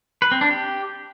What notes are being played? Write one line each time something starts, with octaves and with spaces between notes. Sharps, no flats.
B4
C4
D4
G4